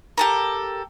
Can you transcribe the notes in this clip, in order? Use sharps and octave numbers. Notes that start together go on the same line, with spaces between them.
G4 A4 A#4